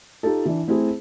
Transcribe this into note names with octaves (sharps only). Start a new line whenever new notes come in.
D#4 F4 G4 A4
E3 D4
A3 C4 E4 G#4